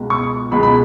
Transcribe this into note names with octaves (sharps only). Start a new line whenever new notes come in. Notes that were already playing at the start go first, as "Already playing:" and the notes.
Already playing: C#2 B2 G#3
C#6
C#2 B2 G#3 B5
B5